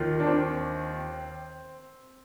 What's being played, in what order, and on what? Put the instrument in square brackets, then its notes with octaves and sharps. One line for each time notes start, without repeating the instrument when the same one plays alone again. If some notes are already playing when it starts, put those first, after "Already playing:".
Already playing: [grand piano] D#2 D#3 F4
D4
C4